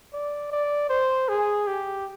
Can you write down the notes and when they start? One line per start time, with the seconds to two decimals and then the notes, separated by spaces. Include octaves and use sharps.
0.13 D5
0.52 D5
0.90 C5
1.29 G#4
1.67 G4